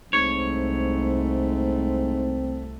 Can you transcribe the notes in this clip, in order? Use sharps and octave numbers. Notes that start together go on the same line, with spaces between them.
C2 G#2 A3 C4 C#5